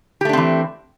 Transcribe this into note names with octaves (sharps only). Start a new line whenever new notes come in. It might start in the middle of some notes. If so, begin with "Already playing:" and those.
E3 A3 C4 D4 G4